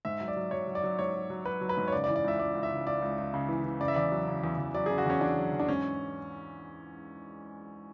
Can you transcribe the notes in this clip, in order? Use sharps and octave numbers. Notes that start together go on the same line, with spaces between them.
G#2 E5
F#3
D5
F#3
F#3 C#5
F#3
D5
F#3
G#2 C#5
F#3
F#3
F#3 B4
F#3
B4
G#2
C#5
C#3 D5
D5
E3
D5
C#2 E5
C#2 D5
C#2
E5
C#3
C#2 D5
C#2
C#2
C#3
E3
E3
C#3 D5
E5
E2 D5
F#3
C#3
E2
E2
F#3 D5
C#3 G#4
F#4
E2 C#4
E2 D4
F#3
E2
D4
G#2 C#4